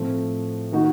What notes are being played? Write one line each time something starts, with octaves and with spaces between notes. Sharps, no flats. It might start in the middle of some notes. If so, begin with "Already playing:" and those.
Already playing: A2 F3 A3 C4
D#3 A#3 D#4 F#4